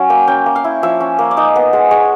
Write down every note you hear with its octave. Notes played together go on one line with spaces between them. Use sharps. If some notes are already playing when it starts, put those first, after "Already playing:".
Already playing: F#3 C#4
A#3 G5
C#4 G5
A#3
F5
E4
F3 E5
C#4
A#3
D5
D#4 D#5
B3
G#3
G#3 C#5